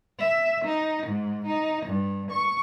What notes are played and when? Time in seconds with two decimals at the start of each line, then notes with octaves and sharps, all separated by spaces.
0.19 E5
0.64 D#4
1.06 G#2
1.45 D#4
1.85 G2
2.30 C#6